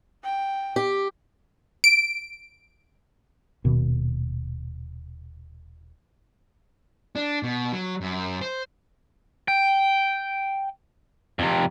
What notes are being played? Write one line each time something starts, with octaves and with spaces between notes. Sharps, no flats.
G5
G4
D7
D#1 B2 D#3 B3
D4
B2
F#3
F#2
C5
G5
F2 C3